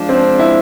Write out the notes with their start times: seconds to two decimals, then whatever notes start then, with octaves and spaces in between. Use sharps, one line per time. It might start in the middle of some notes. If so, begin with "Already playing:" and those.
Already playing: F3 G#3 D4
0.09 C4
0.39 E4